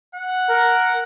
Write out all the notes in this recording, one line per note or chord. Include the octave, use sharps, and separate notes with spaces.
F#5
A#4